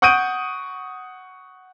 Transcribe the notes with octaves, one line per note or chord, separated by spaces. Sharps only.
F#5 C#6 D#6 G6 D7 D#7